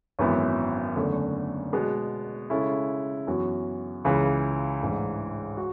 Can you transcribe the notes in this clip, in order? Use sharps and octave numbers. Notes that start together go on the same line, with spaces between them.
G#1 F#2 E3 B3 E4
F#1 E2 D3 A3 C#4
B2 G#3 B3
C#3 G#3 C#4 E4 A4
F#2 E3 B3 F#4
C#2 C#3 E3
A1 G#2 E3 G#3 D4
F#4